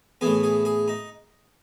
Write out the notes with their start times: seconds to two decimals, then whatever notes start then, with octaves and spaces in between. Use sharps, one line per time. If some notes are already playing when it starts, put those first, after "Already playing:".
0.21 A2 E3 B3 G#4
0.43 G#4
0.65 G#4
0.88 D#4